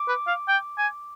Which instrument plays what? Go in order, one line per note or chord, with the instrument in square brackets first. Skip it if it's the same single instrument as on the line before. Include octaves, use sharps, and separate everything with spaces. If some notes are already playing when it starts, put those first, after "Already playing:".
Already playing: [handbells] D6
[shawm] B4
F5
G5
G#5